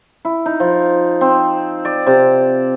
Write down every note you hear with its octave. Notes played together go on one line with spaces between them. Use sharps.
E4
D#4
F3
C4
D5
C3